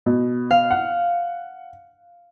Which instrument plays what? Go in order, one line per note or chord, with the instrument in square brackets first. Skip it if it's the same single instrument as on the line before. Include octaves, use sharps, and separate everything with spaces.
[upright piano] B2
[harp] F5
[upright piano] F#5